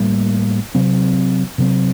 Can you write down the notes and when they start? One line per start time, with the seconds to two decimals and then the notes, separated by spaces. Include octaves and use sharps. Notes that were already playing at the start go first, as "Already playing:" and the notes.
Already playing: A2 G3 A#3
0.75 C3 F#3 C4
1.58 C3 F#3 C4